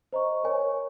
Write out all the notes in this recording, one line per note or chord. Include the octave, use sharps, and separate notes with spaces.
C5 D#5 A#5 C#6
A#4 C#5 G#5 C#6